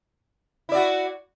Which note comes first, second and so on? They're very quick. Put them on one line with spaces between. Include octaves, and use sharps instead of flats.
E4 D5 F#4